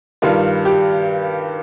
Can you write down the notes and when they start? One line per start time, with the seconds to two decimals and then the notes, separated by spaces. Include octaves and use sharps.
0.22 G2 D#3 G3 F4
0.65 G4